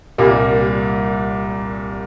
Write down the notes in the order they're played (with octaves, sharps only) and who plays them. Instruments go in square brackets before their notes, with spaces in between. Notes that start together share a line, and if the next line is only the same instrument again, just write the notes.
[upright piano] C2 A#2 G3 A#3